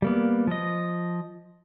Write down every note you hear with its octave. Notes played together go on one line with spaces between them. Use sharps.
G3 A#3 B3
F3 D#5